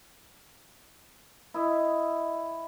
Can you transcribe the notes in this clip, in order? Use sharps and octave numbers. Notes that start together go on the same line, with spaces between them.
E4 D#5